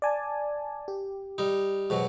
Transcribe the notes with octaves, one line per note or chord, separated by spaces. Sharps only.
D5 G#5 A5
G4
G3 D#4
G#2 B2 F#3